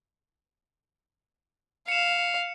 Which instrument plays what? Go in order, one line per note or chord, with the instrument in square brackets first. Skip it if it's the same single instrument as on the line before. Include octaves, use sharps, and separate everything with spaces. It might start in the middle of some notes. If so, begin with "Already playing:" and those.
[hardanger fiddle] F5 [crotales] C#7 E7